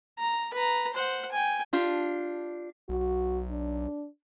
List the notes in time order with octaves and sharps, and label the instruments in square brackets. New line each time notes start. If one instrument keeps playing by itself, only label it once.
[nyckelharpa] A#5
B4 A#5
C5 F#5
G5 G#5
[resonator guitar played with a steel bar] D4 F4 G4
[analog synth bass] B1 [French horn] F#4
[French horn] D4